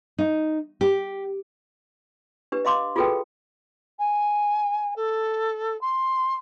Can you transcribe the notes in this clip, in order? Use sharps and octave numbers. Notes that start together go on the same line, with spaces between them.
D#4
G4
D4 G4 B4
D#5 F5 C6 D6
F4 F#4 G#4 A4 B4 G5
G#5
A4
C6